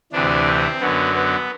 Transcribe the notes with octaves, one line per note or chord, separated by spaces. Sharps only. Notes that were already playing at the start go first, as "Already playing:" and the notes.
D2 C3 E3 D4
C4
F#2 D3 F#3 B3
B3